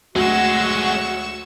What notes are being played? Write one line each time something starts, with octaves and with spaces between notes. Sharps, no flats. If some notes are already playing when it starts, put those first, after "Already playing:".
D2 F#3 G#3 F#4 C#6 E6